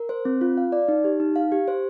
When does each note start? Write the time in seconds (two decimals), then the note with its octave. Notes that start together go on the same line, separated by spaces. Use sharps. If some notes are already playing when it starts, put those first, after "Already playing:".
Already playing: A#4
0.09 C5
0.25 C4
0.41 F4
0.57 F5
0.72 D5
0.88 D#4
1.04 G4
1.20 D#4
1.36 F5
1.52 G4
1.68 C5